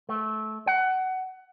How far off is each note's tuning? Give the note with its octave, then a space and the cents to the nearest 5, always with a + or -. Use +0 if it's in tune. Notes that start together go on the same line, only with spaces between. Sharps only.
A3 -20
F#5 +20